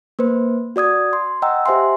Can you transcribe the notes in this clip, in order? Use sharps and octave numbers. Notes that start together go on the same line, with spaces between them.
A#3 B4 C5
F#4 D5 D#6 G#6
C6
D#5 F#5 G5 A#5 E6
G4 C5 E5 G#5 C6